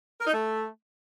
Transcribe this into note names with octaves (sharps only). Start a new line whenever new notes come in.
A#4
D#4
A3